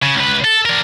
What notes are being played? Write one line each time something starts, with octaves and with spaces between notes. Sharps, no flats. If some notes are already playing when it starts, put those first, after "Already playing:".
C#3
C#2 B4
A4
D4 A#4